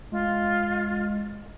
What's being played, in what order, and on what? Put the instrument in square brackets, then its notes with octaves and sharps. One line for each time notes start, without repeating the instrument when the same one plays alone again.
[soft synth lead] G#3 [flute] F4